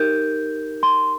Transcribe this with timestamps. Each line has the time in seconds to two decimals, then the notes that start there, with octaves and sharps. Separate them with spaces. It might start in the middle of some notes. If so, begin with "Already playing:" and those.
Already playing: D#4 G4 A#4 G6
0.83 C6